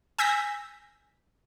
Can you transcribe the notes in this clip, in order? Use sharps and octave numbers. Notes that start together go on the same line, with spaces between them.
G#5 E6 G6 A#6 B6